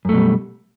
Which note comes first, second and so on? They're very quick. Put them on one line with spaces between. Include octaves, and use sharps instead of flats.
F#2 A3 B2 G3